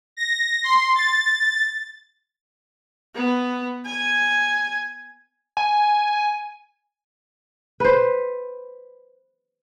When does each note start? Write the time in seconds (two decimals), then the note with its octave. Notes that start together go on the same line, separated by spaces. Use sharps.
0.17 A#6
0.63 C6
0.95 A6
3.15 B3
3.86 G#5
5.57 G#5
7.80 B4 C5